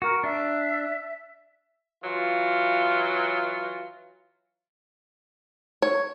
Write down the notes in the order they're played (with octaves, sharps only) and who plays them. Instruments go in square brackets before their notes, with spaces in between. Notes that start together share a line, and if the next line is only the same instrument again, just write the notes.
[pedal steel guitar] F#4 [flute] A#4
[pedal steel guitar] D4 [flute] E5
[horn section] E3 F#3 F4
[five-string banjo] C#5